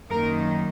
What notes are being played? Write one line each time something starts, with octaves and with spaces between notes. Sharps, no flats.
F#2 D#3 A#3 D#4 A#4